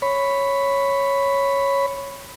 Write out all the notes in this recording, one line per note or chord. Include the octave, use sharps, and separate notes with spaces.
C#5 B5